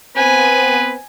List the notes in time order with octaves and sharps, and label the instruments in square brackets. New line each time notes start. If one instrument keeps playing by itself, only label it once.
[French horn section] B3 C4 C5 [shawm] B4 [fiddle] G#5